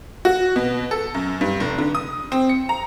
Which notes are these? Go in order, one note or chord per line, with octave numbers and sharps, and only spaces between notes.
F#4
B2
A4
F#2
G2
F1
D3
D#6
C4
C#7
A#5